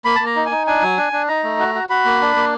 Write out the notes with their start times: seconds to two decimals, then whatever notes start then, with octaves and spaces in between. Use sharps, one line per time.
0.05 A#3 B5
0.16 A#3 A5
0.26 A#5
0.36 D#4
0.46 D#4 G#5
0.67 D4 G#5
0.82 F#3
0.97 D4
1.13 D4
1.28 D#4 A#5
1.44 A3
1.59 F#4
1.75 F#4
1.89 F#4 B5
2.05 A#3
2.21 D4
2.36 A#3